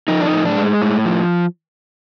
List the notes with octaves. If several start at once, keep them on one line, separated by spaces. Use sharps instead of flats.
F3 D#4
D4
D#4
A2
D4
G#3
A2
F3